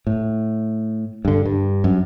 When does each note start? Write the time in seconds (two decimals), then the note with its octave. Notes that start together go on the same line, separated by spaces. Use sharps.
0.07 A2
1.25 G2 D3
1.46 G2
1.84 F#2